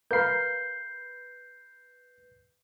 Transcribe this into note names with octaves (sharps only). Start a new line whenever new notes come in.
A#4 B4 F5 B5 G6 C7